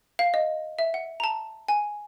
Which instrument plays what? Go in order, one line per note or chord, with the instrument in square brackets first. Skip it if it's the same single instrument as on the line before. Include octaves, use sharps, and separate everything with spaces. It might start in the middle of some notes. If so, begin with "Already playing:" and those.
[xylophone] F5
D#5
E5
F#5
A#5
A5
G#5